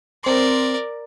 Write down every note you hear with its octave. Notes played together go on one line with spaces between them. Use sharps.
C4 A#4 D5 C6